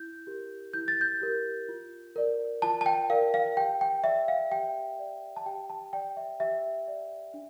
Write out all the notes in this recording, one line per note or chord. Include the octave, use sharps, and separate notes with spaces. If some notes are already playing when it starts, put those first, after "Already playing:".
Already playing: E4 G6
G4 A#4
E4 G6
A6
G6
G4 A#4
F4
A#4 D5
F4 A5
A5
G5
A#4 D5 F5
F5
G4 G5
G5
D5 E5
F5
G4 G5
D5
A5
G4 G5
A5
D5 G5
E5
G4 E5
D5
D4